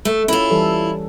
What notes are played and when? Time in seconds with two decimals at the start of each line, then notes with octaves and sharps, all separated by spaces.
0.05 A3
0.28 C#4 E4 F4
0.50 E3 G3 A4